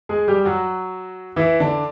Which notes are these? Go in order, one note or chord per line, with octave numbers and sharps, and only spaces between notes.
G#3 G#4
G3 G4
F#3 F#4
E3 E4
D3 D4